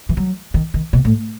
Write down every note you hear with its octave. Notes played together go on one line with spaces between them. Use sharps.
E3
F#3
D#3
D#3
B2
A2